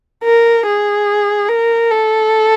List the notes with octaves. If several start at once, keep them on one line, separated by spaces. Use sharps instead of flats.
A#4
G#4
A#4
A4